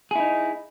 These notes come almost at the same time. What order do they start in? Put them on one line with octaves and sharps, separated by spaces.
G#4 E4 D#4